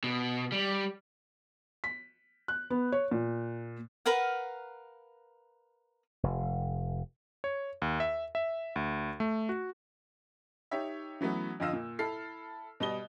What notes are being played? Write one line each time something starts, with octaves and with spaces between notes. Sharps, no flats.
B2
G3
B6
F#6
B3
C#5
A#2
A#4 B4 F5 F#5
F1
C#5
D#2
E5
E5
D2
A3
F#4
D#4 G4 C#5 E5
E3 F#3 A3 B3 C#4
F2 D3 F4 D#5 F5 E6
A#2
E4 A4 F6 C7
B2 G3 D#5 G7